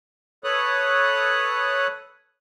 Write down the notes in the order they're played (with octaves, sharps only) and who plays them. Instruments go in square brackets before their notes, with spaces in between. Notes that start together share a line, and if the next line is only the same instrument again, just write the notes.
[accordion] A4 B4 C#5 D#6 F#6